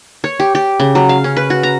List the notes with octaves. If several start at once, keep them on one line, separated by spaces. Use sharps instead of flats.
C#5
G4
G4
C#3
F#3
F5
C#4
B4
F#4
A#5